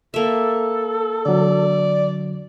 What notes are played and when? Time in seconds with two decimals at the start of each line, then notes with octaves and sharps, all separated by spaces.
0.14 A#3 A4 E5
1.26 D3 F#3 D5